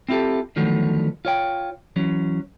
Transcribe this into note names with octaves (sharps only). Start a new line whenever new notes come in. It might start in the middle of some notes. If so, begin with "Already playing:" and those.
C4 E4 F4 G4 A4
D3 D#3 F3 F#3 A3 B3
F4 C#5 G5
E3 F#3 C#4